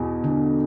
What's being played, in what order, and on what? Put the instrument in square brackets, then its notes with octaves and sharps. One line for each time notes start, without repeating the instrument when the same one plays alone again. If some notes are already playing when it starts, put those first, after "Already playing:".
Already playing: [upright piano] E2 B2
[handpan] D3